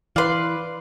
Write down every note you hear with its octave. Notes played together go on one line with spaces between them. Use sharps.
E3 B4 D5 F5 C6